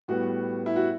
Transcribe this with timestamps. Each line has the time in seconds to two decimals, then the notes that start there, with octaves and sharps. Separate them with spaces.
0.08 A2 G3 B3 F#4
0.66 E4
0.76 F#4